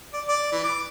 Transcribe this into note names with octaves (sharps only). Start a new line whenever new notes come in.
D5
D5
E3
D6